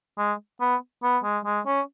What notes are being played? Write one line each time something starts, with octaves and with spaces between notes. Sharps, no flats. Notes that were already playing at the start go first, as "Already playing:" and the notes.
G#3
B3
B3
G#3
G#3
C#4